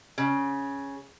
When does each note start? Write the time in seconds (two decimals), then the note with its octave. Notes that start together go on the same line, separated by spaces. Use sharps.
0.18 C#3